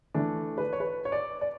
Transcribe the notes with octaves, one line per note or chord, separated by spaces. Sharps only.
E3 A3 D4
B4
C#5
B4
C#5
D5
D5